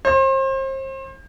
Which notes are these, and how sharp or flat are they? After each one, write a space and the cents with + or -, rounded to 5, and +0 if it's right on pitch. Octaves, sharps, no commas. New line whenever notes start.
C5 +35